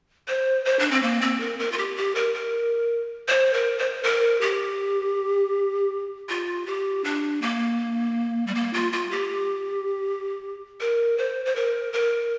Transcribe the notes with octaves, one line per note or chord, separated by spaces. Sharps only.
C5
C5
D4
C4
A#3
C4
A#4
A#4
F4
G4
G4
A#4
A#4
C5
A#4
C5
A#4
G4
F4
G4
D4
A#3
G3
A#3
F4
F4
G4
A#4
C5
C5
A#4
A#4